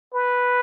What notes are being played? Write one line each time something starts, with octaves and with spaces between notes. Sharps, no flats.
B4